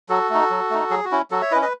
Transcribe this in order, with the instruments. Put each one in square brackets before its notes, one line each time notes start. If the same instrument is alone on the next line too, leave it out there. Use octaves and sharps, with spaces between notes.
[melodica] F#3 F#4 A4
A3 D#4
F#3
A3 D#4
F#3 G#4
F#4
C#4 E4
F#3 F#4 A4
C#5 E5
E4 B4 D#5
C#4
B4 D#5